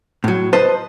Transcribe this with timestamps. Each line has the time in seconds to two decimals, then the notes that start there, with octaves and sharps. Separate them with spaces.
0.24 A2 F#3
0.53 B4 C5 D#5 A5